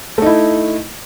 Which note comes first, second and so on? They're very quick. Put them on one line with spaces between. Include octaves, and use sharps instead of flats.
A3 D#4 E4